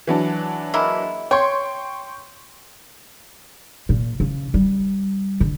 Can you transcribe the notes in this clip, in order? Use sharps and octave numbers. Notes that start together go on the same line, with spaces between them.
E3 F#3 D4
G#3 A#3 E4
C#5 G5 C6 C#6
A#2
C#3
G3
D3